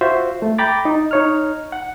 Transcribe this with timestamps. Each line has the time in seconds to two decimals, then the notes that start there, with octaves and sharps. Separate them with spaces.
0.01 F4 F#4 C5 E5
0.42 A3
0.58 G5 A#5 B5 D6 A6
0.85 D#4
1.11 D#4 C#5 F6
1.72 F#5